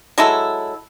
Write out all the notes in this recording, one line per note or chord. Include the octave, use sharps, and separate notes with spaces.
F#3 G#3 E4 A4